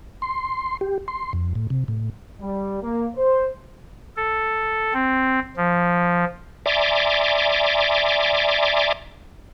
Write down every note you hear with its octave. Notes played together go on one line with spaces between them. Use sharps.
C6
G4
C6
F2
A2
C3
A2
G3
A#3
C5
A4
C4
F3
D5 E5 G#5 A#5 C6 D6